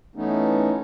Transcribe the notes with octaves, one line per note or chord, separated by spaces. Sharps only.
E3 A3 B3 C#4 D#4